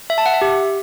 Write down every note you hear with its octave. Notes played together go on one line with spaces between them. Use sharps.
E5
A5
F#5
E5
G4